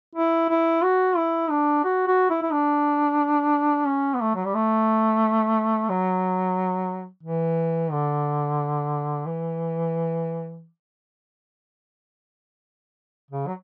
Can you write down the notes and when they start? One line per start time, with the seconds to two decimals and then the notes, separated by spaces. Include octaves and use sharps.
0.15 E4
0.49 E4
0.83 F#4
1.17 E4
1.50 D4
1.84 F#4
2.07 F#4
2.30 E4
2.42 E4
2.51 D4
3.86 C#4
4.14 B3
4.21 A3
4.35 F#3
4.45 G3
4.55 A3
5.89 F#3
7.23 E3
7.92 D3
9.26 E3
13.30 C#3
13.47 F#3